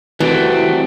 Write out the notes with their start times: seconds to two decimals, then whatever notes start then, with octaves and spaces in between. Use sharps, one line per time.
0.20 C2 E3 A3 C4 F#4